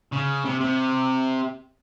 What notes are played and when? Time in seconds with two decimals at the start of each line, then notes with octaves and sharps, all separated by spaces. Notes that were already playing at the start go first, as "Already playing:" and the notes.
0.12 C#3
0.45 C3
0.60 C3